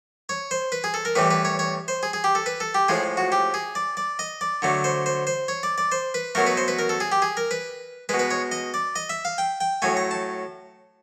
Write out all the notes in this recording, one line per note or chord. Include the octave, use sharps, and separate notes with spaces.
C#5
C5
B4
G#4
A4
A#4
A2 E3 G3 B4
B4
C#5
C#5
C5
G#4
G#4
G4
A4
B4
A4
G4
A2 F3 G#3 G#4
F#4
G4
G#4
D5
D5
D#5
D5
D3 F#3 A3
C5
C5
C5
C#5
D5
D5
C5
B4
B2 F#3 A3 A#4
B4
C5
B4
A#4
A4
G#4
G4
G#4
A#4
B4
B2 G#3 B4
B4
C#5
D#5
D5
D#5
E5
F5
G5
G5
A2 F#3 A3 G#5
A#5
A5